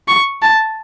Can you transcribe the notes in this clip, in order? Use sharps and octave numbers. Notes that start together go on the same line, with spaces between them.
C#6
A5